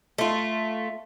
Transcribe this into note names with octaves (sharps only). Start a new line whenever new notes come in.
A3 F4